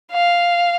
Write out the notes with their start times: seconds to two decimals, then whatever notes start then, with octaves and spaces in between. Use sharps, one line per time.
0.12 F5